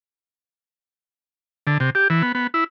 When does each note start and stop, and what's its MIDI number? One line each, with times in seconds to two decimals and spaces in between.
1.67 1.78 50
1.80 1.90 48
1.95 2.08 67
2.10 2.22 52
2.22 2.32 59
2.35 2.47 59
2.54 2.64 64